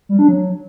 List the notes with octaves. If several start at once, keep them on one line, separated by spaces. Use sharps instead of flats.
G3
D4
F#3